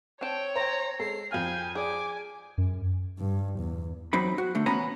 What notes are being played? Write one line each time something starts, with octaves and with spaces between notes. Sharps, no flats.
C4 C#5 G5 A5
C5 G5 A#5
G#3 A4 C7
F2 F5 G5 G#5 F6
G#4 D5 G#5 D6
F#2
G2
E2
E2 F#3 C4 D#4 B5
F#4
D3 A3
E2 B3 C#4 G#5 A#5 B5